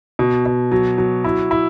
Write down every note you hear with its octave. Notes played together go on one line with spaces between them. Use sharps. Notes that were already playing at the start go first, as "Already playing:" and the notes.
B2
B2
F#3
F#3
E4
E4